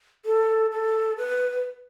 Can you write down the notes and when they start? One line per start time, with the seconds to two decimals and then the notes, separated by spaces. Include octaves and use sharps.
0.25 A4
0.71 A4
1.18 B4